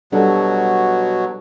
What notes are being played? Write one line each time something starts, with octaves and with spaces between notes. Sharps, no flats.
B2 F#3 G3 D4 A4